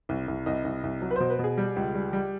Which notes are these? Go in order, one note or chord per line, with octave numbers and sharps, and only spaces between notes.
C2
C2
C2 D#5
C2
C2
F#3
B4
B2 C5
B4
B2 G#4
G3
C#2
G3
G3